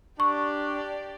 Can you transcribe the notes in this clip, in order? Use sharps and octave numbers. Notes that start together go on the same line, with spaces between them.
D4 G4 D5 C#6